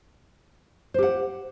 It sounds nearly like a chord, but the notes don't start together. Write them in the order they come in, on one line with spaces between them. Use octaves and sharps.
C5 G4 F#5